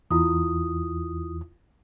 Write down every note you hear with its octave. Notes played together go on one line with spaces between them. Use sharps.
E2 E4 F4 D#6